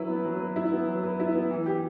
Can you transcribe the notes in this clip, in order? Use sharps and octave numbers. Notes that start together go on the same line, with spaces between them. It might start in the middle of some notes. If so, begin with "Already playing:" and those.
Already playing: F#3 E4 B4
B3
F#3
B4
E4
B3
F#3
B4
E4
B3
E3
G4